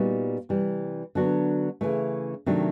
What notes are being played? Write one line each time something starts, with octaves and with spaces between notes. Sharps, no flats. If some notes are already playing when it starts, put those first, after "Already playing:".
Already playing: A#2 G3 B3 D#4 F#4
C3 E3 G3
D3 F#3 B3 D4 F#4
C#3 E3 A3
C3 D#3 F#3 A3 D4